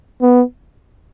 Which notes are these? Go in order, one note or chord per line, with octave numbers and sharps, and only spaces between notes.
B3